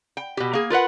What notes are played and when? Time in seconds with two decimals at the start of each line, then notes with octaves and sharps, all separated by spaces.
0.17 G5
0.37 B2 G4
0.53 A#3 G#4
0.70 F4 A#4 B4 F#5